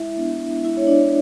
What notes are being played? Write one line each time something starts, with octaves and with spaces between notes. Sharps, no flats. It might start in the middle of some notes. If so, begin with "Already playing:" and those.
Already playing: G#3 E4 E5
B3 D4
G#3 E4 E5
C#5
D4 D5